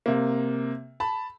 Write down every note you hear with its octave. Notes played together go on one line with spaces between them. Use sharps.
C3 A#3
A5 B5